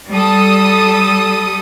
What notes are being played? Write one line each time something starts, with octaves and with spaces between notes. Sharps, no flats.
G3 A4 D#6